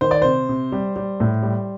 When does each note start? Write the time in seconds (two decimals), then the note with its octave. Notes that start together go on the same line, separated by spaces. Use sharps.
0.01 D#3 C5
0.11 D5
0.22 C3 C5
0.49 C3
0.72 G3
0.96 G3
1.20 A2
1.43 G3